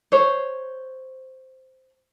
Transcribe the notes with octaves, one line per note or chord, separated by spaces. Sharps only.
C5 C#5